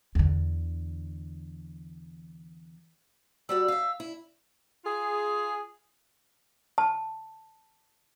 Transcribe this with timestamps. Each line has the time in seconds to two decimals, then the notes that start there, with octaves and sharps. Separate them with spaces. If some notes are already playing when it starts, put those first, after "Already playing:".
0.15 E2 D3
3.49 G3 F#4 D5 E6
3.68 E5 F5
4.00 E4
4.85 F4 G#4
6.78 A5